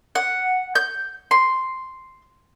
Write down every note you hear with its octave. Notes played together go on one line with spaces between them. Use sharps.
F#5
G6
C6